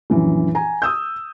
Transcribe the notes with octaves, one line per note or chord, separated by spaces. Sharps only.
A#1 F#2 E3
G#5 A#5
D#6 E6 G6